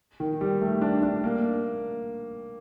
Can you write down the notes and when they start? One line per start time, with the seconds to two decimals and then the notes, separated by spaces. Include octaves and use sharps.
0.20 D#3
0.41 G3
0.61 A3
0.82 D4
1.02 D4
1.24 A#3